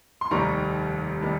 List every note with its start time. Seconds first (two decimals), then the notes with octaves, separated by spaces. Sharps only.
0.21 C6
0.31 F1 D#2 D#3 G3 A#5 C#6
1.22 D#3 G3